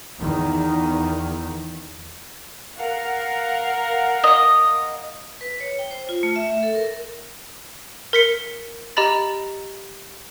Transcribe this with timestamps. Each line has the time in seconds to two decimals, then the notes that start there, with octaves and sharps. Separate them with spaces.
0.19 E2 D#3
2.77 A#4 F5 F#5
4.24 D#5
5.41 B4
5.60 C#5
5.79 G5
5.91 C5
6.09 F4
6.23 A3
6.36 E5
6.50 E5
6.63 A4
6.75 A#4
8.13 A#4 B6 C#7
8.97 G4 D#5 A#5 B5 A6